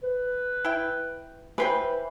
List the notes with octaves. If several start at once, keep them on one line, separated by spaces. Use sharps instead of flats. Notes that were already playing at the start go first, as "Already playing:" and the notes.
B4
E4 G5
E3 B4 C5 G5